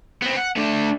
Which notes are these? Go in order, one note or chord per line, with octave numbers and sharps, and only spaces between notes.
B3 C4
F#5
A3 D4